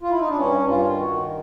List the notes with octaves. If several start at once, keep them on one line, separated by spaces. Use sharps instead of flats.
F4
E4
D#4
D4
G2 C#4
G2
F4
D#3
F#4
D#3